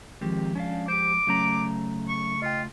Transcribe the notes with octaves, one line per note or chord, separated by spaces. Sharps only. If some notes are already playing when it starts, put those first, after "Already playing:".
D#3 F3 G#3 C4 G4
C#4 D4 F5
G4 C5 D6
C#3 F#3 A3 C#4 A#5
C#6
F4 D#5 G5